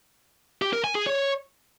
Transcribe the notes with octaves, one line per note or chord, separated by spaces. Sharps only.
G4
A#4
G#5
G#4
C#5